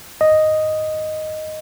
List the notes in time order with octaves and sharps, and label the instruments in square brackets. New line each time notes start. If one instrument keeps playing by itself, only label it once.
[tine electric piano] D#5